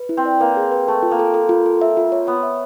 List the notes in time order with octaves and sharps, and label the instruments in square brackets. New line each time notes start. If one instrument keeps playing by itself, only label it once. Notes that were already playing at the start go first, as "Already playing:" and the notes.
Already playing: [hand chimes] B4
E4
[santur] C4
[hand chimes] D5
[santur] A#3 [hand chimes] B4
[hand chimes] G#4
B4
[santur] A3 [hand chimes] A4
[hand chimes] F4
[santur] A#3
[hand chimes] A4
A4
F4
A4
E5
F4
C#5
[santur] B3 [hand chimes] C#5
[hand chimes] E5